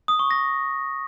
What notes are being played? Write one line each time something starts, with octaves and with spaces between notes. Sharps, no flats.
D#6
C#6
A#6